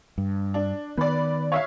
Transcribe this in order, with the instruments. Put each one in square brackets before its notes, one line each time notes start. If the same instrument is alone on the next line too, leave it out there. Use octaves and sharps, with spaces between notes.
[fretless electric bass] G2
[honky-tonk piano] D4
[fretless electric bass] D#3 B3 [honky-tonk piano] B4 D5
[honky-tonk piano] C#5 E5 F5